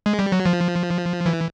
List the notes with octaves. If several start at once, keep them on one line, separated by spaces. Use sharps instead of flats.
G#3
G3
F#3
F3
E3